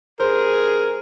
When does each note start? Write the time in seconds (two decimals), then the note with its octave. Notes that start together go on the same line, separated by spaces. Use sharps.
0.19 G2 G#4 A#4 C5